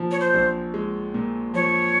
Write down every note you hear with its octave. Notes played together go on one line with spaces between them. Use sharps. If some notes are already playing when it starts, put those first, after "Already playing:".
Already playing: A#2 F3
C#5
C5
A#1
G#3
A#2
F3 C#5